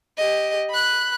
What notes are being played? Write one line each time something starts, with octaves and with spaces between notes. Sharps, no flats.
G4 D#5
B5 F#6